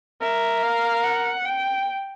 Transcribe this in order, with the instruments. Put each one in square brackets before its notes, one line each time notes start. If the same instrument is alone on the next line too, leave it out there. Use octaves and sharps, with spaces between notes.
[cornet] A#4 [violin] E5
[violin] F5
F#5
G5